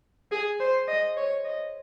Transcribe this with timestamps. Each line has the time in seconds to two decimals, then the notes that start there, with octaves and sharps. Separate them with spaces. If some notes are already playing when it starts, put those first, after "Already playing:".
0.32 G#4
0.60 C5
0.88 D#5
1.17 C#5
1.45 D#5